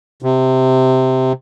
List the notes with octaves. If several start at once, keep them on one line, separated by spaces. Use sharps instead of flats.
C3